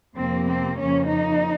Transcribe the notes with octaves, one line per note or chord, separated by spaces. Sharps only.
F2 C3 F3 A#3 C4
C4
F2 C#3 F3 A#3 C#4
D#4